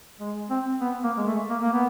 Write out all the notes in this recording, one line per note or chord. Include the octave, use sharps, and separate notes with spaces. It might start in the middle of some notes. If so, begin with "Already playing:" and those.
G#3
C4
B3
A#3
G#3
A3
A#3
A#3
B3